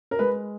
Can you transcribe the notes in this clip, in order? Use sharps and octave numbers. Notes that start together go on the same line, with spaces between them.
A#4
G#3 B4